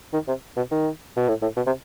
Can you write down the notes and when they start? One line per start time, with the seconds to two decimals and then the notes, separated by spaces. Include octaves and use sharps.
0.13 D#3
0.28 C3
0.57 B2
0.71 D#3
1.17 B2
1.29 A2
1.42 A2
1.57 B2
1.67 C3